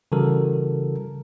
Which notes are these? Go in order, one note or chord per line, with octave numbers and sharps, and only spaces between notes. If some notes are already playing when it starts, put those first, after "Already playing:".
C#3 E3 G3 F#4 A4 A#4